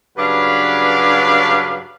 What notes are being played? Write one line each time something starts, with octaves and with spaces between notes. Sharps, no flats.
G2 C#3 F#3 D4 B4 F5